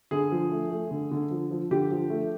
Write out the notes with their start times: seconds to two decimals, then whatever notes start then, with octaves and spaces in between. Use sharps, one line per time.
0.11 D3 G#4
0.32 F3
0.52 A3
0.70 A3
0.91 D3
1.11 D3
1.31 F3
1.51 F3
1.71 D3 G4
1.91 F3
2.10 A3